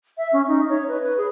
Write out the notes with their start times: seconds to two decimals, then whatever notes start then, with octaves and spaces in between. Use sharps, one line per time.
0.18 E5
0.33 C#4
0.48 D#4
0.69 C#5
0.88 B4
1.03 B4
1.18 G#4